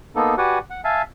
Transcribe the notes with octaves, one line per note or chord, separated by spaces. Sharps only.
A#3 B3 D#4 A4
F#4 G4 B4 D5 F#5 G#5
F#5
E5 F5 G#5 A5